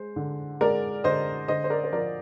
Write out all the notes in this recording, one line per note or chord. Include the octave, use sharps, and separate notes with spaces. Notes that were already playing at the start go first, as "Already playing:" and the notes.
Already playing: G#3 C5
D3
G#3 A#4 D5
D3 C5 D#5
D3 C5 D#5
C5
A#4 D5
C5
F3 A#4 D5